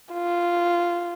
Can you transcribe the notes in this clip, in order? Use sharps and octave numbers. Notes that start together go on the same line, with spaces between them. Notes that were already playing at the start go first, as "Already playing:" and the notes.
F4